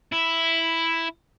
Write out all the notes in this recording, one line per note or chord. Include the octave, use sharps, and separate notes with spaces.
E4